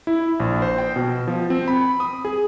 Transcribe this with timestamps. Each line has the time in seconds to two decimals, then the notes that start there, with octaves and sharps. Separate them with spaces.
0.07 E4
0.40 A#1
0.62 C5
0.78 G5
0.96 B2
1.27 F3
1.50 C4
1.68 B5
2.00 D#6
2.25 G#4